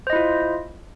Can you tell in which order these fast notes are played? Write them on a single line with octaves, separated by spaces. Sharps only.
C5 D#5 E4 F4